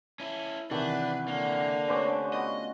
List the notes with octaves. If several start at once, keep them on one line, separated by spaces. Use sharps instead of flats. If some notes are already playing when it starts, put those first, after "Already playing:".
C#4 E4
C3 D#3 E3 D4 B4 F#5
D3 A#3 F#5
C3 A3 C#4 B4 C5 D6
B3 F4 F#4 D#5